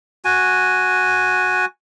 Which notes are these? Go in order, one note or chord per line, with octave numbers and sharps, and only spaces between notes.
F#4 G#5